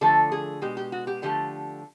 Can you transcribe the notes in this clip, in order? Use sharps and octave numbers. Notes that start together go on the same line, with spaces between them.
D3 F3 A3 A4
G#4
B2 G#3 G4
G4
F#4
G4
D3 F3 A3 G4